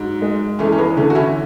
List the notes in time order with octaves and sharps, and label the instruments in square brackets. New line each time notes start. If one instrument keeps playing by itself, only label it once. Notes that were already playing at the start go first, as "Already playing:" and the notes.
Already playing: [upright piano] G#2 F#3
G#3
[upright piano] E2 [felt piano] A3 C#4
[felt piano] C#4
G#3 B3
[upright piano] D3 [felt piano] A3 C#4
[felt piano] F#4
C#4 E4